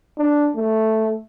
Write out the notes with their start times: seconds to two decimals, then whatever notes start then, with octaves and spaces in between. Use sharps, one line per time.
0.18 D4
0.56 A3